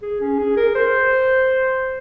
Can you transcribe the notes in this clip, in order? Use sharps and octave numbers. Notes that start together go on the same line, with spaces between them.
G#4
C#4
G#4
A#4
C5